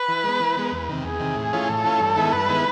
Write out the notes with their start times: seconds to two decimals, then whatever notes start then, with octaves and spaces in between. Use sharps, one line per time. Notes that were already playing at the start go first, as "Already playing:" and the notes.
Already playing: B4
0.09 E3
0.24 G#3
0.29 B3
0.40 E3
0.57 G#3 B3
0.72 E2
0.89 C3 D#3
1.05 E2 G#4
1.20 C3 D#3
1.36 A2
1.53 E3 A3 C#4 F4
1.69 A2 A4
1.84 E3 A3 C#4 F4
2.01 G2
2.16 D#3 G#3 B3 E4
2.33 G2 B4
2.49 D#3 G#3 B3 E4